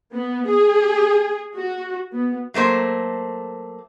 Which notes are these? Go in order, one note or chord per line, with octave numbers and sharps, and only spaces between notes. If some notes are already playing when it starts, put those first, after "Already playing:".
B3
G#4
F#4
B3
F#3 A3 A#3 C5